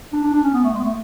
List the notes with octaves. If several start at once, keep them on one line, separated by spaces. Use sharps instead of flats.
D4
D4
D4
C#4
B3
A3
G#3
B3
A3